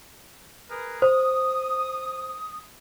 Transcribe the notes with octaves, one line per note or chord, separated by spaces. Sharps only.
G#4 A#4 B4
C5 D#6